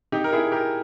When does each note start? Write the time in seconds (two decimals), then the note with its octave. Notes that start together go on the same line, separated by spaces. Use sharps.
0.12 D#4 G4
0.24 A#4
0.33 E4 G#4
0.52 G4 A#4